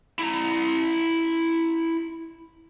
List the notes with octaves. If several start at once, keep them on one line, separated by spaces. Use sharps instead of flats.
E4 A#5